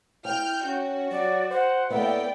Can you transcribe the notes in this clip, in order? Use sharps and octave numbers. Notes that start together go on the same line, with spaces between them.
E4 G5 F6 G6
C#4 F#4
F#3 D5
C5 F#5
A2 A#3 B3 D5 E5 G5